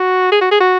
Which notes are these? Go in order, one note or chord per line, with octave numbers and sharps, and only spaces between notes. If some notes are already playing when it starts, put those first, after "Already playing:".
Already playing: F#4
G#4
F#4
G#4
F#4